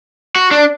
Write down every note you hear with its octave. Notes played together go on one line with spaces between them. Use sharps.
F#4
D4